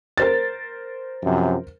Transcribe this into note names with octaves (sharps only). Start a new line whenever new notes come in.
A#4 C5 A6
F#2 C3 F3